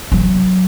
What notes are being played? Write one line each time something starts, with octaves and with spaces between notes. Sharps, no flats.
F#3